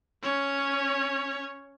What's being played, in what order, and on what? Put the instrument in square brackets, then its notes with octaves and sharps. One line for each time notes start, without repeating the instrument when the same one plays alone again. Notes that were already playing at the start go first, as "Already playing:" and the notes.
[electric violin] C#4 C#5